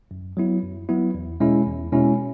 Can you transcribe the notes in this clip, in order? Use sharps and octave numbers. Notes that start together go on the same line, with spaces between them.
F#2
F#3 B3 E4
F#2
F#3 B3 E4
E2
B2 G#3 C#4 E4
E2
B2 G#3 C#4 E4